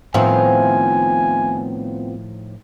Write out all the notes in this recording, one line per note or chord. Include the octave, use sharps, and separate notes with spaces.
A2 D#3 F3 B3 C4 F4 G#5